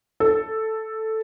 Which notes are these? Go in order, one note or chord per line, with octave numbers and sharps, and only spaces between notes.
A4